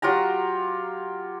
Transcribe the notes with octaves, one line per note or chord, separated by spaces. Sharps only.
F#3 F4 G4 A#5